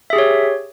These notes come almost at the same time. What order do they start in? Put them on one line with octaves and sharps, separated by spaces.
E5 G#4 G4 C#5